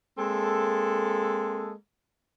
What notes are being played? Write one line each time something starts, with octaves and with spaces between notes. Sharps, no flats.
G#3 A#3 C4 A4